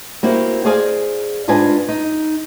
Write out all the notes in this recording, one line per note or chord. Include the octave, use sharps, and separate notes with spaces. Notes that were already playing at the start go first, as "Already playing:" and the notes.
A#3 C4 E4 F#4 G4
G#4 C5 D5 D#5 F5 G#5
G#2 D4 F4 B4 D#5 G#5
D#4